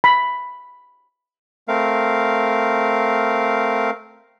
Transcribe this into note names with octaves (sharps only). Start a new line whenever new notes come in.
B5
A3 C4 A#4 F5